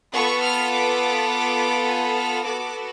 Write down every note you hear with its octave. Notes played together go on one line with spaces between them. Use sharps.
B3 F4 A4 C#6
F6
D6
G#5
F6
B3 F#4 A4 D6